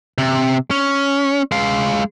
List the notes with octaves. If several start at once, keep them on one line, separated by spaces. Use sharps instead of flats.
C3
C#4
G#3 F5